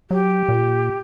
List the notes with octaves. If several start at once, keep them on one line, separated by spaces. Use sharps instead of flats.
F#3 G4
A#2